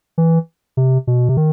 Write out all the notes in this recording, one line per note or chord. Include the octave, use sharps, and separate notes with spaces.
E3
C3
B2
C3
D#3